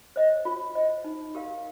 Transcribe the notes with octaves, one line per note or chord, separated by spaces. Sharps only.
C5 D#5
F4
C5 D#5
D#4
G4 A#4 F5